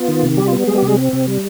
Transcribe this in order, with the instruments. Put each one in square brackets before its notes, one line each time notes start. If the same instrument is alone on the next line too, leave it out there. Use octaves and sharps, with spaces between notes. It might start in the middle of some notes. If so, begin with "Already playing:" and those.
Already playing: [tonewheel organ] B3 F4
D#3
C3
G3 G4
F4
B3
G3 G#3 G#4
G4
C3
G#3 G#4
C4
C3
G3